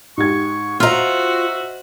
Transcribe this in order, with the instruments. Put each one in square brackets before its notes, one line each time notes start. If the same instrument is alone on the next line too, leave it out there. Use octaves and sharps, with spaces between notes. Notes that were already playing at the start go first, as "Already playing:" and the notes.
[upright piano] G#2 G4 G#6 [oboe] C#6
[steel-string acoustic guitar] F4 A#5 [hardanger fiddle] F#4 C5 [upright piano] D#5 F6 [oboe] E5